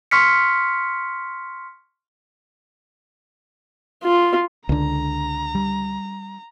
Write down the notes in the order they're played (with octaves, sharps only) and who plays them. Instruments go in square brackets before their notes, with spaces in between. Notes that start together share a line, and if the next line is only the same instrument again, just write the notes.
[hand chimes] C6 C#6 F6 B6 C#7
[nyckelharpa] F4
[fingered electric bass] C#2 D3 [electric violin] A#5
[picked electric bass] G3